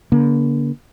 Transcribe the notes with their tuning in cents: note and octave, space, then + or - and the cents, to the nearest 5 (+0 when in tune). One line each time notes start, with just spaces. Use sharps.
D3 -35 A#3 +30